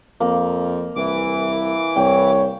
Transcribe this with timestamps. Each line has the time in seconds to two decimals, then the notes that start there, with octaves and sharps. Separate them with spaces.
0.20 F2 A#3
0.96 C2 E3 D6
1.96 C2 C#5 G5